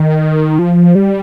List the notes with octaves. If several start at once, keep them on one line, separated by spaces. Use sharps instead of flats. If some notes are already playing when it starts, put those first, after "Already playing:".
Already playing: D#3
F3
G3